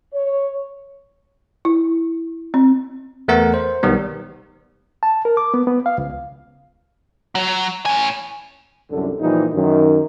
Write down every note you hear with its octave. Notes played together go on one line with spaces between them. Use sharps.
C#5
E4
C4
E2 A3 B3 A#4 F#5
C5
B1 D#3 G3 B3
A5
A#4
D6
B3
B3
F5
C#2
F#3
A2 G#5
C2 F#2 D3
A#2 E3 F3 G3 D#4
F#2 D#3